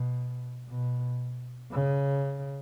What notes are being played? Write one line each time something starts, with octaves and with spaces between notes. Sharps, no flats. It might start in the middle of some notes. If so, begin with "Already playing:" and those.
Already playing: B2
B2
C#3